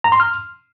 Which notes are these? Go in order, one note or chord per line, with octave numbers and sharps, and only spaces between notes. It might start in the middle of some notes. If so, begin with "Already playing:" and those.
A#5
C6
F6